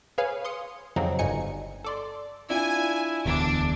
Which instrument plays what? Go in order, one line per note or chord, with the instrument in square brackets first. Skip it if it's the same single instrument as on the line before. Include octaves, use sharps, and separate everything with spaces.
[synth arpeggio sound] G#4 B4 C#5 F5 G#5
C6 D#6 C#7
F2 C#3 F#3 C4 D#4
G1 G2 D#4 G#5 C#7
A4 D5 C6
[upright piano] D4 F4 [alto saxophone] E4 [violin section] G#5
[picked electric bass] D1 E2 [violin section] D4